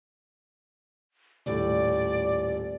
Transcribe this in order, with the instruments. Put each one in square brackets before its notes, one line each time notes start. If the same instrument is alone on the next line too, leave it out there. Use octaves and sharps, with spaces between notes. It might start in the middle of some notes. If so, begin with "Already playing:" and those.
[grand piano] D#1 A2 [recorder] D5